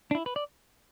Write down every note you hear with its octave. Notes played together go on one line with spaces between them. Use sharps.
D4
E4
B4
D5